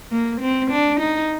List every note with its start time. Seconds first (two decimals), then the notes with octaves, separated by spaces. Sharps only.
0.12 A#3
0.41 C4
0.71 D4
1.00 D#4